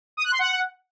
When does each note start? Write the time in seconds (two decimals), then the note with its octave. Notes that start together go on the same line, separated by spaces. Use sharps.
0.17 D#6
0.24 F#6
0.32 C6
0.39 F#5